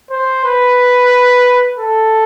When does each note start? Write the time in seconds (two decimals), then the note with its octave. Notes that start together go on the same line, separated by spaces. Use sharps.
0.10 C5
0.45 B4
1.78 A4